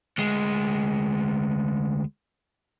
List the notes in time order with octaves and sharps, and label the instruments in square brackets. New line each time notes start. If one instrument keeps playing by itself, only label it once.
[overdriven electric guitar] D2 G#3